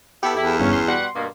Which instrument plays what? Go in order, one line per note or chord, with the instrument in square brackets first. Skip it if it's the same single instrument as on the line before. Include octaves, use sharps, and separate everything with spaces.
[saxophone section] B3 E4 [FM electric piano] G4 A4
[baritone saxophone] E2 [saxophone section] E4
[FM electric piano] G1 [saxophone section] C#4
[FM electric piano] C6
[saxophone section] B2 G3 F#5
G2 B2 A#3